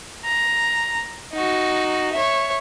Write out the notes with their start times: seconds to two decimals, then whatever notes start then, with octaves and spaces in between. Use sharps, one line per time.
0.25 A#5
1.33 D#4 F#4
2.12 C#5 E5